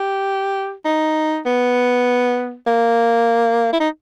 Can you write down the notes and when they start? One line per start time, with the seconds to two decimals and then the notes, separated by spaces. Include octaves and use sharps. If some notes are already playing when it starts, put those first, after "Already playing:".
Already playing: G4
0.85 D#4
1.46 B3
2.67 A#3
3.73 E4
3.80 D#4